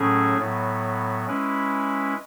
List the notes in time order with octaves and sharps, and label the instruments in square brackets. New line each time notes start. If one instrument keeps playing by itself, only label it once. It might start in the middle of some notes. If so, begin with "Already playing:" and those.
Already playing: [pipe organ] A2 F#3 A3 C#4 G#4
A2 F#3 B3
G#3 C#4 E4 B4